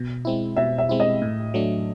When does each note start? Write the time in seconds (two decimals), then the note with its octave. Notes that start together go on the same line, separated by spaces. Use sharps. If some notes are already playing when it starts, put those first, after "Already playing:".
Already playing: B2
0.25 G#3 C4 E4
0.56 B2 E5
0.78 E5
0.89 G#3 C4 E4
1.00 D#5
1.22 A2
1.54 F#3 A3 D4